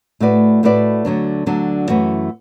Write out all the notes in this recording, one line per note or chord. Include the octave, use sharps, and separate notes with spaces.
A2 A3 F#4 B4 D5
A2 A3 F#4 B4 D5
D2 D3 F#3 D4
D2 D3 F#3 D4
F#2 E3 A3 F#4